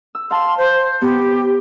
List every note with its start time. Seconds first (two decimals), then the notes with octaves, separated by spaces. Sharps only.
0.15 E6
0.31 F5 A5 C6
0.58 C5
1.02 B3 G4